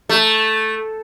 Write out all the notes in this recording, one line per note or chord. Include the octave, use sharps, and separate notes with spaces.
A3